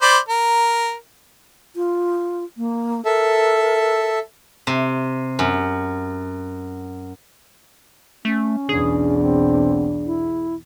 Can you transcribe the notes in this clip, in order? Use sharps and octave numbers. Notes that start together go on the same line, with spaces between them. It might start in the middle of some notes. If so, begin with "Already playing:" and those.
C5 D5 B5
A#4
F4
A#3
A4 A#4 E5
C3
F#2
A3 C#4
B1 E2 D4 G#4
C4
E4